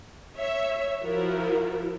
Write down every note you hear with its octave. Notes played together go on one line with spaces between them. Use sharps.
C#5 E5
F3 E4 F#4 A#4